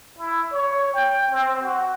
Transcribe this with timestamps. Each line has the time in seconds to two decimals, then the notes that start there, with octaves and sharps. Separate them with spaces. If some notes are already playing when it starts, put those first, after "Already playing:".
0.19 E4
0.52 C#5
0.94 G5
1.30 C4
1.62 F#4